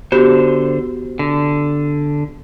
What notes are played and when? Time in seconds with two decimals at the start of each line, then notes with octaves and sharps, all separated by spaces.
0.12 D3 B3 F#4 G4 C5
1.19 D3